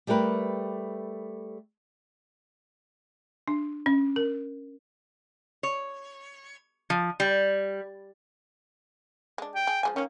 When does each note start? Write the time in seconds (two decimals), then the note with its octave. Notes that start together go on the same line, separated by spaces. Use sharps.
0.07 G3 A3 G4 A#4 B4
3.48 D4
3.86 C#4
4.16 A#4
5.63 C#5
6.90 F3
7.20 G3
9.38 G#3 D4
9.55 G5
9.67 G#4
9.83 F3 G#3 G#5
9.96 D#3 A#3 C#4